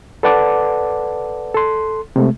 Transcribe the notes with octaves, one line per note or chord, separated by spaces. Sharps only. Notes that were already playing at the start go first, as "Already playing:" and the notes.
A4 B4 D5 F#5 A5 D6
A4 C6
C3 G#3 A3